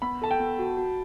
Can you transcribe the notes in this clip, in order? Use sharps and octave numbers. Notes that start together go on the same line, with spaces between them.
B3 B5
A4 A5
G5
B3
F#4
F#4